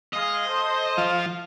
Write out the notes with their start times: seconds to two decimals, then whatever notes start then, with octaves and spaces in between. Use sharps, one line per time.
0.13 G#3 G#4 D#5 F5
0.46 A4 C5
0.97 F3